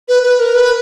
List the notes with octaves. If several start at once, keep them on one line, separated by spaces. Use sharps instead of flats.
B4
B4
A#4
B4